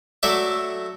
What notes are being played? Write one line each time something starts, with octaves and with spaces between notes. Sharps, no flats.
F#3 A3 D5 E5